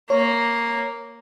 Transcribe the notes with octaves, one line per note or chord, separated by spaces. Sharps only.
A#3 C#5